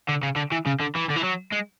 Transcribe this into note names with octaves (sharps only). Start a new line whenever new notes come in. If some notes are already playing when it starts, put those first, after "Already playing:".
D3
C#3
D3
E3
C#3
D3
E3
D3
E3
F#3
G#3